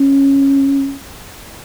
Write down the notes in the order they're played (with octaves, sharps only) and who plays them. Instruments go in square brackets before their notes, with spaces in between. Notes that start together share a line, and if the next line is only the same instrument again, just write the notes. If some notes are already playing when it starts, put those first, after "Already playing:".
Already playing: [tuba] C#4